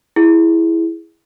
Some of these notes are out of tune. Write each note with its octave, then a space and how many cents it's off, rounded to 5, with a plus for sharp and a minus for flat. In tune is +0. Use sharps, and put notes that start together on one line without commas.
E4 +0 G#4 +0